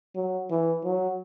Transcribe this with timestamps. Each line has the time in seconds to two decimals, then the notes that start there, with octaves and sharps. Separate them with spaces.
0.16 F#3
0.50 E3
0.84 F#3